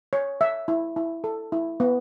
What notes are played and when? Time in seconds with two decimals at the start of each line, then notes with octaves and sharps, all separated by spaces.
0.13 C#5
0.41 E5
0.68 E4
0.96 E4
1.24 A4
1.52 E4
1.80 B3